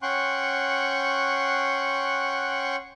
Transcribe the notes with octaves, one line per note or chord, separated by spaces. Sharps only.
C#4 F#5 G5 C6 C#6 F#6